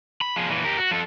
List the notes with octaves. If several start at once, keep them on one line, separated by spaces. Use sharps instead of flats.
B5
F3 G#4
A#2 E3
G4 A#4
F#4
F3 A4